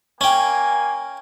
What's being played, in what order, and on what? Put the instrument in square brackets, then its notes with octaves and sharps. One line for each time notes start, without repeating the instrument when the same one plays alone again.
[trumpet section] A#3 G#5 [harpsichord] C#4 G5